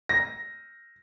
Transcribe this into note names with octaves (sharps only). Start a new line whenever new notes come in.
A#6